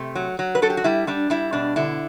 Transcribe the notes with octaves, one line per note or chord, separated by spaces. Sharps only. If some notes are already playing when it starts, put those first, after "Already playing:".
Already playing: C3 A3
F#3
F#3
B4
F#3 A4
G4
F#4
G3 E4
G3 D4
G3 E4
B2 D4
D3 E4